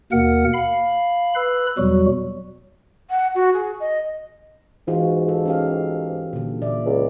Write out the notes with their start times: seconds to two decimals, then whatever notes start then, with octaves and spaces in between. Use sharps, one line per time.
0.12 D#2 B2 A#3 A#4 F#5
0.54 F5 B5
1.35 B4 B5 E6
1.78 E2 B2 F#3 G3 F#4
3.10 F#5
3.35 F#4
3.53 G#4
3.80 D#5
4.88 G#2 E3 F4 F#4
5.28 A4
5.46 C#4 G4 F5
6.33 A#2 D3
6.62 A#2 D5 E5
6.86 C#2